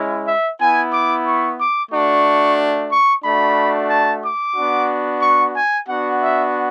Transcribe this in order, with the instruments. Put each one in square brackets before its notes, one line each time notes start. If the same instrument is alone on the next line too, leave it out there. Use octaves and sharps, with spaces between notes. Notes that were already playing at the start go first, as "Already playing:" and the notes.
Already playing: [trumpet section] G#3 C#4 E4
E5
B3 E4 G#5
D6
C#6
D6
A3 D4 F#4 C#6
C#6
A3 D4 F#4 B5
A5
D6
B3 D4 F#4
C#6
G#5
B3 D4 F#4 F#5
E5